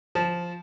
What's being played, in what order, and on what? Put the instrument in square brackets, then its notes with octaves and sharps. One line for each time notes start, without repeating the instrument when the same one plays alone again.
[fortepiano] F3